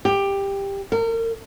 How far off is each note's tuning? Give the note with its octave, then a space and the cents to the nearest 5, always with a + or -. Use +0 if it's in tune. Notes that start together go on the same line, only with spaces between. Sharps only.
G4 +15
A#4 -35